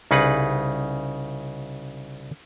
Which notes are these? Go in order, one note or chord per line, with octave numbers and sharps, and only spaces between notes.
C2 C#3 D#4 G#4 B4 F#5